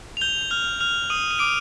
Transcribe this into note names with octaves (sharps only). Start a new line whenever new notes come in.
F7
G6 G7
F6 F7
F6 F7
D#6 D#7
D#7
D6 D7